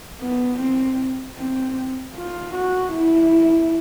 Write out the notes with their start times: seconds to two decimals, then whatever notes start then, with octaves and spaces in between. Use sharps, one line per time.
0.21 B3
0.59 C4
1.38 C4
2.15 F4
2.54 F#4
2.93 E4